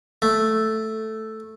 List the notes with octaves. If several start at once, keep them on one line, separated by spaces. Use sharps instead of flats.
A3